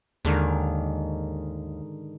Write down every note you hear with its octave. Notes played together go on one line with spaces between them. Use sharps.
D#2 G#2 D3 D#3